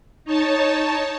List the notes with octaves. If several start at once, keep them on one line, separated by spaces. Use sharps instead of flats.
D#4 C#5 A5